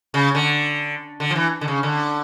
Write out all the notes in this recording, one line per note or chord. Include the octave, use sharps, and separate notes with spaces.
C#3
D3
D3
F3
E3
D3
C#3
D3